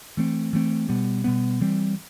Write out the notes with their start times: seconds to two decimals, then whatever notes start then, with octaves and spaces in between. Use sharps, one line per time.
0.17 E3 A3 C4
0.53 E3 A3 C4
0.89 B2 G3 B3
1.24 B2 G3 B3
1.61 E3 G3 C4